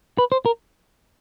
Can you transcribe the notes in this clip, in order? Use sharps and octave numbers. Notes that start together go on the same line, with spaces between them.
B4
C5
A#4